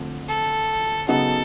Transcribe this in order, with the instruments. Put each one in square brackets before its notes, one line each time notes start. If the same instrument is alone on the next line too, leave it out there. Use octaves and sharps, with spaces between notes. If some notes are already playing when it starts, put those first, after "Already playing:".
Already playing: [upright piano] D3 F3 A3 C4
[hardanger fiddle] A4
[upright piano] C#3 F#3 B3 D#4 F#4 [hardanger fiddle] A4